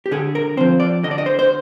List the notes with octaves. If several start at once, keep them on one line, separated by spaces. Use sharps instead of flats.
G4
D3 G#4
A#4
F3 C4 C5
D5
D3 D#5
D5
D#5
C5
C5